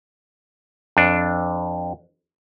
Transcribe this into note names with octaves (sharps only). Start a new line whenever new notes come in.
F2 D4